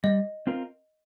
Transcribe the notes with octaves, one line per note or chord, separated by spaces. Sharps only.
G3 D#5
C4 F4 A#4